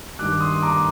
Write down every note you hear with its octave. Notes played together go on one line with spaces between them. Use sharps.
G2 D#3 D6 F#6
C6 D#6
A#5 D6